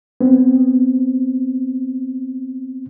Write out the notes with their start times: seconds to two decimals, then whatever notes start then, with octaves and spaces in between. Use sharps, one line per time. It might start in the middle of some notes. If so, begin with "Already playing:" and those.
0.21 B3 C4